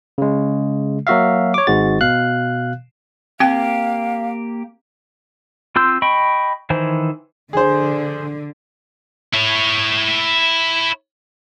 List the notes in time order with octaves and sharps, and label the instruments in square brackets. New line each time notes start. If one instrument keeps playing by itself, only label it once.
[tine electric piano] C#3 G#3
F#3 A#3 F#4 E5 F5
C#5 D6
G#1 G#2 G#3 F#4 A6
B2 F5 F#6
[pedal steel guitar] A#3 G4 [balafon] C4 G5 [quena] F5
[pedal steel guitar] C4 F4 C6 E6 G6
D#5 G5 B5 C#6
D#3 E3 C5 G#5
[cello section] D3 [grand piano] G#4 C5
[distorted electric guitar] E4 C#5